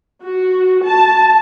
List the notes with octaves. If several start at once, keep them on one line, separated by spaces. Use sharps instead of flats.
F#4
A5